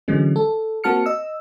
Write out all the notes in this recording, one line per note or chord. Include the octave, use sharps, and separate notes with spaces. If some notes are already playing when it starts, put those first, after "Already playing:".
D3 E3 F#3 G#3 C#4
A4
A#3 C4 F#4 A5 F6 C#7
D#5 E6